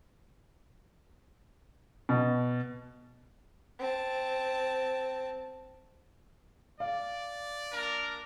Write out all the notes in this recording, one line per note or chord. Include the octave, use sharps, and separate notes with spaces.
B2
C4 A5
D5 F5
A#3 D4 A#4